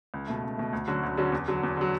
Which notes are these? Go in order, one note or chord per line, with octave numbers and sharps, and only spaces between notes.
C#2
B2 A3
C#2
B2 A3
D2
D3 F#3 C#4 F#4
D2
D3 F#3 C#4 F#4
E2
D3 F#3
E2
D3 F#3